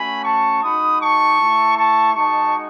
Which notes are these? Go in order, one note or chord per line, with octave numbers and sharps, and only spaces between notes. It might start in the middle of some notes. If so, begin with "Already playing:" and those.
Already playing: A3 C#4 F#4 G#5 B5
A5 C#6
G#3 D#4 F#4 B5 D#6
A5 C#6
A3 E4
A5 C#6
G#3 D#4 F#4 A5 C#6